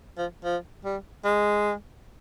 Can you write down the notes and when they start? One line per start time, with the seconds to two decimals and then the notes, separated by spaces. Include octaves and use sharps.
0.18 F3
0.45 F3
0.85 G3
1.25 G#3